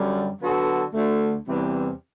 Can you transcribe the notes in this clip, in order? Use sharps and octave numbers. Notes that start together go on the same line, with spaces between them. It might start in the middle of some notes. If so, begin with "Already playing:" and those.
Already playing: F#2 D3 G3
D3 F#3 B3 F#4 A4
D2 D3 A3
E2 C3 E3 G3 C4